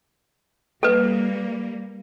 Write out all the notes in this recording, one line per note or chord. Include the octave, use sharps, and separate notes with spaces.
G3 A#3 A4 B4